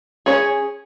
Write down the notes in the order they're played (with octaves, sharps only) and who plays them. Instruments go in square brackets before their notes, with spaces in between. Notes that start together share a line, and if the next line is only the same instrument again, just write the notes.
[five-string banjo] C#4 G#4 C#5